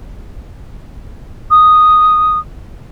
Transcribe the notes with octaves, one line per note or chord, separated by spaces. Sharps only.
D#6